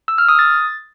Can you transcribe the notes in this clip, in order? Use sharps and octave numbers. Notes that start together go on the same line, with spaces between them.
E6
F6
D#6
A6